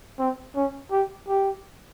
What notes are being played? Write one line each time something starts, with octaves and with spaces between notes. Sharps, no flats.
C4
C#4
G4
G4